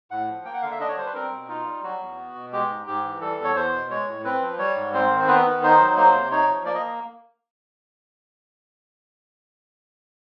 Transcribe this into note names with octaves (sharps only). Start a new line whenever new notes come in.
A2 F#5
F3
A#3 G5
F#5
D3 F5
E5
D4 D#5
C#5
G3 C5
B4
C4 A#4
B2
D#4 F4
G3
F#3 F#4
E2
B3
B2
G#3 G4
G#2
G#2 G4
E3
G3 A4
E2
C#5
E2 C5
B2
G#3 C#5
A2
C4 B4
F3
G3 C#5
G#2
C4 C5
D#3
C5
B3 B4
D#3
D#4 C5
F#3
A#3 C5
C3
D#4 C#5
F3
A#3 D5
D#5